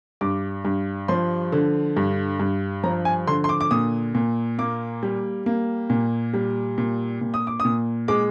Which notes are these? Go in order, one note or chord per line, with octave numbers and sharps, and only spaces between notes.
G2 D6
G2
F3 C6
D3
G2
G2
F3 A#5
G#5
D3 C6
C6
D6
D6
A#2 D#6
A#2
A#3 D6
G3
A#3
A#2
G3
A#2
A#2
D#6
D6
D#6
A#2
G#3 D6